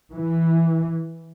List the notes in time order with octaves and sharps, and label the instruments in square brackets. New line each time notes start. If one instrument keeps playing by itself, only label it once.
[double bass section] E3